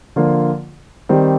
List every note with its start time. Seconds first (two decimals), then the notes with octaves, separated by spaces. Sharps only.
0.16 D3 F3 A#3 F4
1.09 D#3 G3 C4 D#4 G4